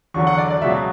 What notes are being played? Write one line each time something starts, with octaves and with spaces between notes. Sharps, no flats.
E2 D3 F#3 C#6
F#5
D5
D5
C#2 B2 F#3 E5